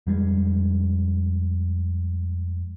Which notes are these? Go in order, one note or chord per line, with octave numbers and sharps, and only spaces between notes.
F2 G3 G#3